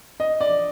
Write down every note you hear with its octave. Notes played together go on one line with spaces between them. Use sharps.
D#5
D5